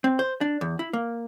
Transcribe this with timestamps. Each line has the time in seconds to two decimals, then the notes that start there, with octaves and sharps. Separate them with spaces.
0.04 C4
0.19 C5
0.41 D4
0.61 E2
0.79 E4
0.93 A#3